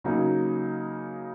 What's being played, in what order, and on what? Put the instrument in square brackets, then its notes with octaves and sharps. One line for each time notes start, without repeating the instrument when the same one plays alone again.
[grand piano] C#3 F#3 A#3 D#4